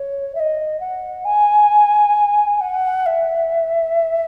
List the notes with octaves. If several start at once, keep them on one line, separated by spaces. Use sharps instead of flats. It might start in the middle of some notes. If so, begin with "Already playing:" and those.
Already playing: C#5
E5
D#5
F#5
G#5
F#5
E5